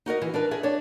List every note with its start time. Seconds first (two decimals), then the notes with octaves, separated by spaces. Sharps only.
0.06 D#4 F#4 A#4 D#5
0.22 E3
0.34 D4 A#4 B4
0.51 G#4 E5
0.63 D4 C#5